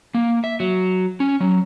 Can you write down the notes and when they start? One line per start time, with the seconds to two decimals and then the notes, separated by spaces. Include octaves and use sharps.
0.14 A#3
0.44 E5
0.60 F#3
1.20 C#4
1.40 F#3